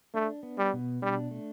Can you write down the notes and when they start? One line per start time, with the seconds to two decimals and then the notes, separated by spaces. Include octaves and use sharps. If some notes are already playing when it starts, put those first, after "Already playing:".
0.14 A3 D4
0.43 B3
0.58 G3
0.73 B2
1.02 G3 D4
1.31 A3